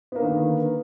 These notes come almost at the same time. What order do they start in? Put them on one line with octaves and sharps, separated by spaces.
B3 A#3 D3 D#3